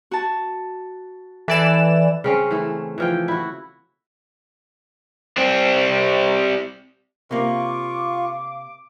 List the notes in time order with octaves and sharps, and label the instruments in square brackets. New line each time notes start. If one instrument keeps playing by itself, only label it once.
[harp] F#4 A5
[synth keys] E3 D5 E7 [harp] A4
[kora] C#3 C4 C#4
E3 A3
E3 F3 G5
E4 F#4
[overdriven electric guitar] G3 C4
[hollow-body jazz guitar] C3 A#3 [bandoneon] F4 C#6 [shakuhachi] F5 [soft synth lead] D6